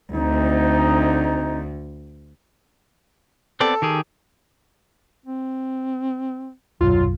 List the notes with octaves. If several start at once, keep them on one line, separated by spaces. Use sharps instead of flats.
D2 C4 D#4
B3 C4 A4 D5
D#3 G4 G#4
C4
D#1 B1 F#2 F#3 F4